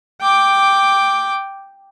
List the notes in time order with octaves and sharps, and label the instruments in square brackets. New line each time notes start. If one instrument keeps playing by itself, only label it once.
[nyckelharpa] G5 D6